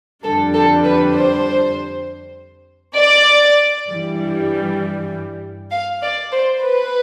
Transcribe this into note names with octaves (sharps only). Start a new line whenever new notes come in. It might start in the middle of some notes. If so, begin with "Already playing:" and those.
F2 D3 G3 D4 A4
A4
B4
C5
D5
G2 E3 G3
F5
D5
C5
B4